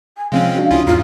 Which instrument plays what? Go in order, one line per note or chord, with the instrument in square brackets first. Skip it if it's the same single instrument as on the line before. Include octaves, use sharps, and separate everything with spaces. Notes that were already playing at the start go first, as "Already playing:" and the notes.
[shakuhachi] G#5
[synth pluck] C3 F3 [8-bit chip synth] G#3 C4 C#4 [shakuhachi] F5
[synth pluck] D4 F#4
[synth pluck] C#2 D#6 [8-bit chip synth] C#4 E4 F4
[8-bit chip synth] E2 G#2 [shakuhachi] F4 [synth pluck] A#5